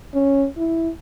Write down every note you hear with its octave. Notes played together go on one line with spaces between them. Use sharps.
C#4
E4